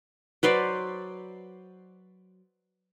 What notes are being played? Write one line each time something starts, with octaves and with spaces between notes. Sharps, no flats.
F#3 B4 C5 D5